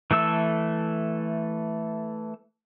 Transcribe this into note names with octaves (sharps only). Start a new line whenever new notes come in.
E3 A3 A4 E6